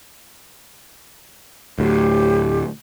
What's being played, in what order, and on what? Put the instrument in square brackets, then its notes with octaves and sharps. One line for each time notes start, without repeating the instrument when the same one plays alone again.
[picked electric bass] D2 A2 [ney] G4